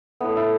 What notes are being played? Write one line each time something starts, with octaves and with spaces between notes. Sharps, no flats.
A2 A3 B3
E4